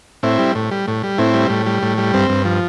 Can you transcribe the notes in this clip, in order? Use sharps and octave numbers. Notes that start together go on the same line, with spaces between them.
A2 C4 E4
G3
A2
G3
A2
G3
A2 C4 E4
G3
A2
G3
A2
G3
G2 C4
G2
F3